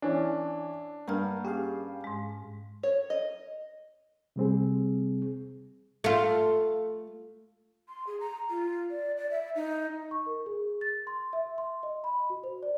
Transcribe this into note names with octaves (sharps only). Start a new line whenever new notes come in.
E3 C#4 D4
G2 A#3 F#5 A#5 F6
C#4 G4 G#4 F5
G#2 G#3
C#5
D#5
C3 G3 C4 G#4
A3 F4
C6
G#4
A#5
F4
D5
D5
E5
D#4
C#6
A#4
G#4
A6
C6
E5
C6
D#5
B5
F#4
C5
D5